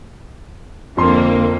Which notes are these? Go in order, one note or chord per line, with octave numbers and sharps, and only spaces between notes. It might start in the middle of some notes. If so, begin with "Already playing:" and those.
F2 D3 A#3 C6